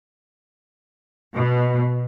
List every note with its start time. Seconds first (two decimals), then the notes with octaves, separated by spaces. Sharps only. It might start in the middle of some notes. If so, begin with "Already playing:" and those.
1.34 B2